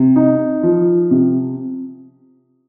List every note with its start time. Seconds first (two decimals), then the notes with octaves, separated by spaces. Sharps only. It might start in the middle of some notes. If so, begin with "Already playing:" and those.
Already playing: C3
0.16 D#4
0.63 F3
1.11 C3